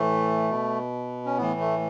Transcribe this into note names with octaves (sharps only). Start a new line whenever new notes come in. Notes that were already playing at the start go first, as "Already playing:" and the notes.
Already playing: A2 E3 A3
B2
C#4
A2 E3 B3
A3